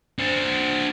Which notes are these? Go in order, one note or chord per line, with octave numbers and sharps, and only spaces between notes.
D4 C5